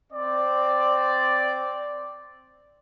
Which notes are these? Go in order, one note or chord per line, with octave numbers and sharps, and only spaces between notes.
C4 D5